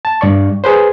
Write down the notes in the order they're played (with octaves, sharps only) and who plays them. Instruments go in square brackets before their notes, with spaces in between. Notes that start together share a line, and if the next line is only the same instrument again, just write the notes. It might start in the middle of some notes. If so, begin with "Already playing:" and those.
[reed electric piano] A5
G2 D5 C#6
G#4 B4 C5